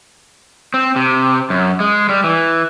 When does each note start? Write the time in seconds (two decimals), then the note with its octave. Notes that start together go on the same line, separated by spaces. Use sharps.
0.74 C4
0.96 C3
1.50 F#2
1.80 G#3
2.09 G3
2.24 E3